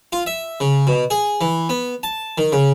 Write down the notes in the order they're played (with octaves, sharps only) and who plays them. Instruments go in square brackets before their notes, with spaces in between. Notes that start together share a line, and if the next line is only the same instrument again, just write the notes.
[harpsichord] F4
E5
C#3
B2
G#4
E3
B3
A5
D#3
C#3